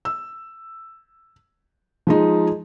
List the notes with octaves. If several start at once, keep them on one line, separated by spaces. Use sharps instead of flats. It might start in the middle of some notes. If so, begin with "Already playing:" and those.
E6
F3 G#3 D#4